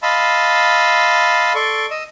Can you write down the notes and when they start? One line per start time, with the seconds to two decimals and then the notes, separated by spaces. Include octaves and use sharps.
0.03 D#5 F5 A5 B5 C6 E6
1.55 A4 D5 C6 C#6
1.91 D#5 E6